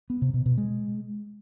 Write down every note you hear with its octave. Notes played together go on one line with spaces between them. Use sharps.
B3
C3
B2
B2
G#3